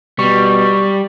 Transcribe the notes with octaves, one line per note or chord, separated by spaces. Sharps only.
B2 G3 C#6